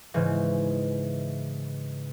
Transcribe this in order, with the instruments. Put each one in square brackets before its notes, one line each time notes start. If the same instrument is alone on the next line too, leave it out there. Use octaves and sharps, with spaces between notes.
[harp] G#2 C#3 E3